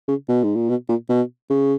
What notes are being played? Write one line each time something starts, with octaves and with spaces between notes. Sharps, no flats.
C#3
B2
G#2
A#2
B2
A#2
B2
C#3